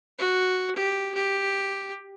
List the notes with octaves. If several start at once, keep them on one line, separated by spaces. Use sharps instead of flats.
F#4
G4
G4